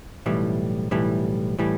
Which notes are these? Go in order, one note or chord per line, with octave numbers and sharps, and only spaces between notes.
B1 A2 E3 G3
B1 A2 E3 G3
A2 E3 G3